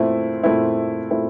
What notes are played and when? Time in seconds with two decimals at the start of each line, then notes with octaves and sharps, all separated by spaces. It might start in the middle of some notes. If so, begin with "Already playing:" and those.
Already playing: A#2 A3 C4 E4
0.43 A#2 A3 C4 E4
1.10 A#2 A3 C4 E4